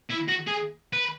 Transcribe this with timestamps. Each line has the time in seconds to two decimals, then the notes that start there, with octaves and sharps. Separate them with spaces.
0.11 E4
0.29 F#4
0.48 G#4
0.93 B4